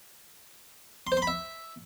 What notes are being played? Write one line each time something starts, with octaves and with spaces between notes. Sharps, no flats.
C6
C5
C6
B5
E5